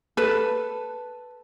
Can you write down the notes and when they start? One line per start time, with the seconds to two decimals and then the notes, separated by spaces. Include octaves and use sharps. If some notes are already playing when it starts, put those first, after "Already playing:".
0.17 A4 B4